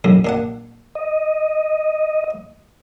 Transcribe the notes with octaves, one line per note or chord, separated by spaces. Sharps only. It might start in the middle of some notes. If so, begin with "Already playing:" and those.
B1 F#2 A2
A#2 D4 F#5
D#5